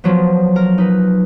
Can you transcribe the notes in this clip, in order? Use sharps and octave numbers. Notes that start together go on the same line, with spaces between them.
F3 F#3 B3
A#4
D#4 B4